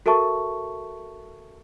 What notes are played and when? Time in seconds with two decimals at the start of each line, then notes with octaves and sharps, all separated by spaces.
0.06 F#4 A4 A#4 E5 A5 C#6